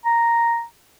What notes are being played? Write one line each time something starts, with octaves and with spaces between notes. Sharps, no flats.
A#5